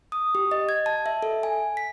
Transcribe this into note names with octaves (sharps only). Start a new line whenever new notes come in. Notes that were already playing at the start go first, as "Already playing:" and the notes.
D#6
G4
D#5
G#6
A5
E5
A4
G#5
B6